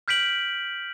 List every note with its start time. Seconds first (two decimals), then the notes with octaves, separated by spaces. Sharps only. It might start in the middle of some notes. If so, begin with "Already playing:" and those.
0.08 F6 G6 B6 D7 F#7